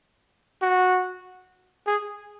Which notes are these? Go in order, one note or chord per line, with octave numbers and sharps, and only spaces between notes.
F#4
G#4